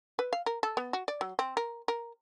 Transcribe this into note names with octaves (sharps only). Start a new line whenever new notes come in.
B4
F5
A#4
A4
B3
F#4
D5
F#3
C4
A#4
A#4